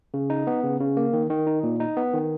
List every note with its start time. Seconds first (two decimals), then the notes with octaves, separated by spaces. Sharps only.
0.14 C#3
0.30 D#4
0.47 B3
0.64 C#3
0.80 C#3
0.97 A#3
1.13 D#3
1.30 D#3
1.47 D#4
1.63 A#2
1.80 D#4
1.97 B3
2.13 D#3